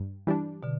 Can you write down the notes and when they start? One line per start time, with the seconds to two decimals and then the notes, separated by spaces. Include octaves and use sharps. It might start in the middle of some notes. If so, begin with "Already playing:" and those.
Already playing: G2
0.27 E3 G3 D4
0.63 B2 D3